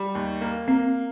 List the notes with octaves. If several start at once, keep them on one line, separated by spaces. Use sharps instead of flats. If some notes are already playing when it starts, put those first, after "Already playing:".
Already playing: G3
D#2
A#3
A#3 C4